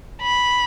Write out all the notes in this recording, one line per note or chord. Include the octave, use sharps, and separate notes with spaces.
B5